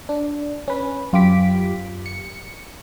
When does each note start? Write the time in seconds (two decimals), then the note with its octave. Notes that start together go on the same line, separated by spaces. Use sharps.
0.09 D4
0.68 C#4 B4
1.13 F#2 F4 G4 D6 B6
2.06 C#7